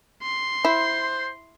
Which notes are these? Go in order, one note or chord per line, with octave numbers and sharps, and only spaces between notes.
C6
E4 C5